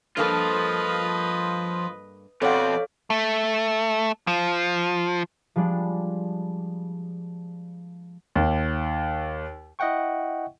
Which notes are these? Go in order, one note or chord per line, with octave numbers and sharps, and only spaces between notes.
G2 F3 A#3 F4 A4 B4 D#5
F2 B2 C4 A4 C#5 D5 F5 F#5
A3
F3
F3 G3 G#3 D4
D#2
E4 D#5 E5 F#5 G5 C#6